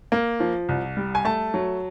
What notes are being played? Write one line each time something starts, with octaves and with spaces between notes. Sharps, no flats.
A#3
F3
C2
G3
G#5
A3 A5
F#3